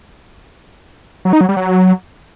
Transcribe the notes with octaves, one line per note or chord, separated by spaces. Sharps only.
F#3
D#4
F#3
G3
F#3